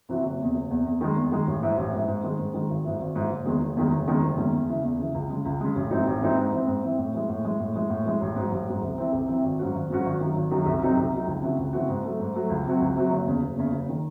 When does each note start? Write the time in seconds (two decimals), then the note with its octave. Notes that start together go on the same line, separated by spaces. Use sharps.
0.09 C3 E3 C4 F#4
0.24 F#1
0.39 E2 C3
0.55 F#1
0.70 E2 C3
0.85 E2
1.01 D#3 G#3
1.16 E2
1.32 D#3 G#3
1.47 A1
1.62 G#2 E3
1.77 A1
1.93 G#2 E3
2.08 G#2
2.23 D#3 G#3
2.39 G#2
2.53 D#3 G#3
2.70 G#1
2.84 G#2 E3
3.00 G#1
3.15 G#2 E3
3.31 F#1
3.46 E2 D#3 G#3
3.61 F#1
3.77 E2 D#3 G#3
3.92 F#1
4.07 E2 D#3 G#3 C#4
4.23 F#1
4.38 E2 D#3 G#3 C#4
4.53 E2
4.68 C#3 E3
4.84 E2
4.99 C#3 E3
5.14 C#2
5.30 C#3 G#3
5.45 C#2
5.60 C#3 G#3
5.76 A1
5.91 G#2 E3 C4 D#4
6.07 A1
6.22 G#2 E3 C4 D#4
6.37 G#2
6.52 E3 C4
6.67 G#2
6.83 E3 C4
6.98 A2
7.14 E3 G#3
7.29 A2
7.44 E3 G#3
7.60 A2
7.75 E3 G#3
7.90 A2
8.06 E3 G#3
8.21 A1
8.36 G#2 F#3
8.51 A1
8.67 G#2 F#3
8.82 C2
8.98 C3 E3 C4
9.13 C2
9.28 C3 E3 C4
9.44 G#1
9.59 G#2 F#3 C#4 F#4
9.74 G#1
9.90 G#2 F#3 C#4 F#4
10.05 G#1
10.20 F#2 D#3 F#3
10.36 G#1
10.51 F#2 D#3 F#3
10.66 C2
10.82 C3 F#3 C4 D#4
10.97 C2
11.12 C3 F#3 C4 D#4
11.27 C#2
11.43 C#3 E3 C4 F#4
11.58 C#2
11.73 C#3 E3 C4 F#4
11.88 G#2
12.04 F#3 A3
12.20 G#2
12.34 F#3 A3
12.50 C#2
12.66 C3 F#3 C4 F#4
12.80 C#2
12.96 C3 F#3 C4 F#4
13.11 F#1
13.26 E2 C#3
13.42 F#1
13.57 E2 C#3
13.73 F#1
13.89 D#3